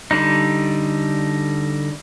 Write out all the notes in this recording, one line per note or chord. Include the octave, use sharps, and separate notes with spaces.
D3 G3 D#4